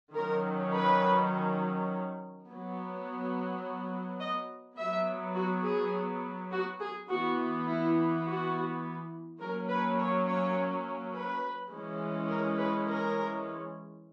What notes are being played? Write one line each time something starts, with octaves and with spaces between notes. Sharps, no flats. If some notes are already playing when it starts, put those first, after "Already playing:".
D#3 F#3 C#4 A#4
B4
F#3 B3
D#5
F#3 B3 E5
F#4
G#4
F#4
G#4
E3 B3 F#4
E4
F#4
F#3 A#3 C#4 A#4
B4
C#5
C#5
B4
E3 G#3 C#4
A#4
B4
A#4